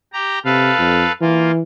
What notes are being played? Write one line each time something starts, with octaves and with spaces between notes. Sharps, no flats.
G4 A#5
C3 A4 B4 F5
F2
E3 A#3 F4